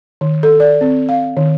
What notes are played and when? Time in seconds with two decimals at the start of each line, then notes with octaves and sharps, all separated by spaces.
0.21 D#3
0.43 A4
0.60 D5
0.81 C4
1.09 F5
1.37 D#3